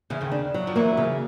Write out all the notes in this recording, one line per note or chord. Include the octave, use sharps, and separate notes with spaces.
E2 C#3 E3
D#2 D#3
D4
F#3
F3
E2 E3 A#3
C#3